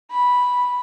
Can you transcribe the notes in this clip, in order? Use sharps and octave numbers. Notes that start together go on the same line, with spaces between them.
B5